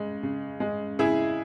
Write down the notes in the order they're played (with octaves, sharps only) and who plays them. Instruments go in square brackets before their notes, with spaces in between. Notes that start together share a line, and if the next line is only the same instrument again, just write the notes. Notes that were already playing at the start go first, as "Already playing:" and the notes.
Already playing: [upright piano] C#3 G#3
C#3
G#3
C#3 E4 G#4